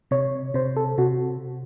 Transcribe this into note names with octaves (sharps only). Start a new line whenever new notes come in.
C3 C#5
C3 C5
A4
C3 F#4